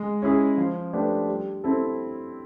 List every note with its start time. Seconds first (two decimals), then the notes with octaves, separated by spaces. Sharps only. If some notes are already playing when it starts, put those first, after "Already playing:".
Already playing: G#3
0.22 C#4 E4 G#4
0.57 F3
0.93 A3 D4 G4 B4
1.28 G3
1.64 C4 E4 A4